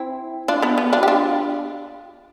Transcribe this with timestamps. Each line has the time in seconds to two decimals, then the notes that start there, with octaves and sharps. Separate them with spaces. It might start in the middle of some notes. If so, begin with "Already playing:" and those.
Already playing: C4 E4
0.48 D4 F4
0.62 B3 D4
0.78 B3
0.93 D4 F4
1.03 G4
1.08 D4 F4